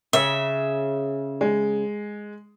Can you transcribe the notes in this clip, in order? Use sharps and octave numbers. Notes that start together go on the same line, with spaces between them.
C#3 E5
G#3